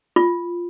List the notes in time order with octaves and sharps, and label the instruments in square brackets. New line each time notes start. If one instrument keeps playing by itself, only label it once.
[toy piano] F4